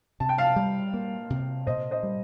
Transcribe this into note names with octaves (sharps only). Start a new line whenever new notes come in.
C3 A5
G5
F5 A5
G3
A#3
C3
A#2 C5 D#5
C5 D#5
G3